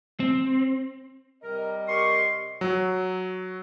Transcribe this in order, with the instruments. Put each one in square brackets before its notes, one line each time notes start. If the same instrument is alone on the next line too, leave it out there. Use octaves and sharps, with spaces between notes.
[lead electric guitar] C4
[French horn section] C3 G3 D#5 [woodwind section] A#4
[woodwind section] G4 A#4 C#6 [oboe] C6
[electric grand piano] F#3